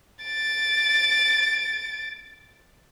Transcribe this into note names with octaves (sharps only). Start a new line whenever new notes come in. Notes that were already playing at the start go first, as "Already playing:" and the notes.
A6 D7